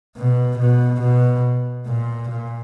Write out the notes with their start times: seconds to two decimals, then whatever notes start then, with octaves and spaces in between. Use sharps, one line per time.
0.16 B2
0.59 B2
1.02 B2
1.87 A#2
2.30 A#2